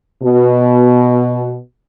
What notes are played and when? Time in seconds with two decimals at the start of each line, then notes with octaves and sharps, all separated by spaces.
0.22 B2